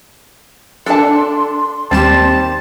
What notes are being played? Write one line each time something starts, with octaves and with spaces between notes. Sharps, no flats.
D4 A4 A5 C6
D#2 G3 C4 A5 E7